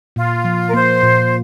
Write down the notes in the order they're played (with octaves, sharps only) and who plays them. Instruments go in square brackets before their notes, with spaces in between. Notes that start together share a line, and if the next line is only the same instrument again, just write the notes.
[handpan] A#2 [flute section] F4
[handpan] F3
[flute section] A#4
[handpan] A#3 [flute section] C5
[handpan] A#2